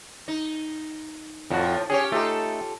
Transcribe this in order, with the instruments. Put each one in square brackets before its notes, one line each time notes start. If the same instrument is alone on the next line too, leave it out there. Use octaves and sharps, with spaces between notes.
[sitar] D#4
[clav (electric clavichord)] F2 F#4 [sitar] A2 F3
[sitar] C#4 G4 C#5 [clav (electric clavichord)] G#4
[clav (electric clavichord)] A3 D#4 [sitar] F4 G4 A4